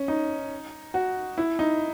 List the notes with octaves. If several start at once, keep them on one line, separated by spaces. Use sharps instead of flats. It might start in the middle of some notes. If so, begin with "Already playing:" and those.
Already playing: C#4
D#4
F#4
E4
D#4